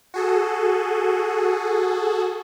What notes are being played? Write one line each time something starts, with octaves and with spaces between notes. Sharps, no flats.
F#4 G#4 A4